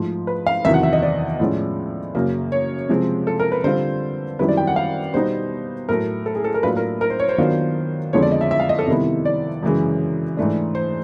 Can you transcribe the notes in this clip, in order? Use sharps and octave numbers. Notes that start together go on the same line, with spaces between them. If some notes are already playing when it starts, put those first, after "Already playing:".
Already playing: G#2 F3 A3
B4
F5
E2 C3 D#3 F#3 E5
F#5
E5
D#5
D5
A2 F3 G#3 C#4
F#2 C#3 F#3 A#3
C#5
C3 F3 G#3 C4
A4
A#4
B4
D3 G3 C4 F4 C5
F#2 D#3 G3 C4 E4 B4
D5
G5
F#5
F5
B2 G3 B3 D#4 C5
A2 F#3 A3 A#4
A4
G#4
A4
A#4
A2 F#3 A#3 D4 F4 B4
A#4
A#4
C5
C#5
C5
D#3 F#3 B3 D4 F4
F2 D3 F3 G#3 B3 C#5
D5
D#5
E5
E5
F5
D#5
A4
C3 D#3 G3 B3 E4
D5
F#2 C#3 E3 G#3
G#2 E3 A3 D4
C5